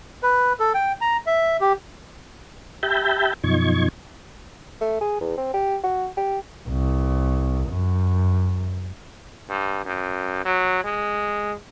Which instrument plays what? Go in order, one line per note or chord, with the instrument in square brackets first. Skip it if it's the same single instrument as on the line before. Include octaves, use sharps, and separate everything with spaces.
[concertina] B4
A4
G5
A#5
E5
G4
[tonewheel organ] G4 E5 G5 A5 B5 G6
F#2 B2 F3 D#4 C#6 G#6
[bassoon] A3
G#4
E2
C4
G4
F#4
G4
[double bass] C2
F#2
[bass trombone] G2
F#2
F#3
G#3